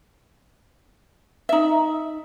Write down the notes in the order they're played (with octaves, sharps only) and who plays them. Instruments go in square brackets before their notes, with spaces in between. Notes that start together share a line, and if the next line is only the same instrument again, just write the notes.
[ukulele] D#4 E5